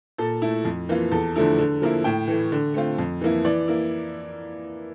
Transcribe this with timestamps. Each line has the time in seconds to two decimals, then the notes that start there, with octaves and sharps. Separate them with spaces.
0.18 A#2 A4
0.42 A3 E4
0.65 F2
0.89 E3 A#3 F4
1.11 E2 A4
1.36 D3 F3 A3 E4
1.59 D3
1.82 F3 A#3 E4
2.04 A2 G5
2.28 E3 A3
2.52 D3
2.74 A3 C4 F4
2.98 F2
3.21 E3 A#3 E4
3.44 E3 D5
3.68 A#3 E4